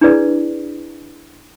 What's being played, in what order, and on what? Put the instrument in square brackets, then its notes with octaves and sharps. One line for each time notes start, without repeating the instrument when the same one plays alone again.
[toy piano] D4 E4 G#4 B4 D5